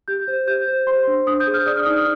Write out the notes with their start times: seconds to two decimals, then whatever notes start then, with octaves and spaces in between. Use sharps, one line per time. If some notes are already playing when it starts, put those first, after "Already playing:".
0.08 G4 G6
0.28 C5
0.47 G4 G6
0.68 C5
0.87 C5 C6
1.07 D4
1.27 D4 D#6
1.40 G6
1.47 G#4
1.54 F6
1.67 D5 D#6
1.76 F6
1.85 D#4 D#6